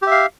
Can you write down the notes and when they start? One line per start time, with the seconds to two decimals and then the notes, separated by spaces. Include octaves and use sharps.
0.02 G4
0.07 E5
0.11 F5